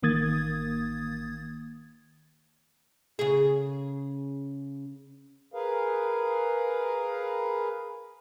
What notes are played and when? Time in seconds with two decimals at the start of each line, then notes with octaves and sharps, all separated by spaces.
0.02 A1 D#3 A#3 D#6 G#6 A6
3.19 C#3 G#4
5.54 G#4 A#4 B4 F5